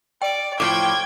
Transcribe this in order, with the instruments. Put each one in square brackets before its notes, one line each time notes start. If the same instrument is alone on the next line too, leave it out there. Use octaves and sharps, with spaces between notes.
[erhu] D5 [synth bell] G5 D7
[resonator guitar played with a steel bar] A2 F3 [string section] G5 [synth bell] D6 [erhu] G#6